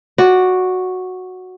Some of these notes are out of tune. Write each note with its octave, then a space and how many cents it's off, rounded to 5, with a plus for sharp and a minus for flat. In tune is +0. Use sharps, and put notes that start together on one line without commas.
F#4 -5 D5 +0